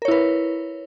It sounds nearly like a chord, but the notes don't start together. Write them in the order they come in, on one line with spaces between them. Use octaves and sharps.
A#4 C#5 E4 B4